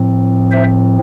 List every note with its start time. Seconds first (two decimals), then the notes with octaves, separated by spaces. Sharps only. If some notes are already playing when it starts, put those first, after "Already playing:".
Already playing: A2 F3 C4
0.51 C5 E5